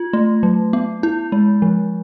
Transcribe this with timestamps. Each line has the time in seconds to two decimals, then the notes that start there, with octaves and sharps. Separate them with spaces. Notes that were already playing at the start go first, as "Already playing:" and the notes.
Already playing: F4
0.13 A3
0.43 F#3
0.73 B3
1.03 E4
1.32 G#3
1.62 F3